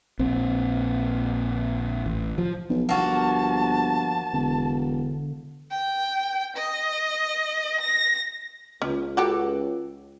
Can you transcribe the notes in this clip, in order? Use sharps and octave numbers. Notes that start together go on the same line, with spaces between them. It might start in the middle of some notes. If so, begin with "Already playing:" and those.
A#1 C4
A1
F3
B1 F3
G1 A#3 F#4 A5
E1 D3
G5
D#5
A#6
C#2 C#4
F#4 G4 A4